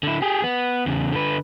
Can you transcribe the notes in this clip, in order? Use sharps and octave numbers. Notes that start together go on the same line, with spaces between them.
D3 E4
G4 G#4
B3
E2 C#3
D3 B4